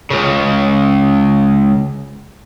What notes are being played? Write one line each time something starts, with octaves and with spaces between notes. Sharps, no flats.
C#2 C#3